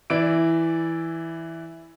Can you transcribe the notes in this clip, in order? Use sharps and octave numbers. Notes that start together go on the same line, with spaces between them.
E3 E4 D5 E6 D7